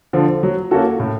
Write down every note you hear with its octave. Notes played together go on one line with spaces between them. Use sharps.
D3 F3
F#3
A#3 C#4 F#4 A4
A2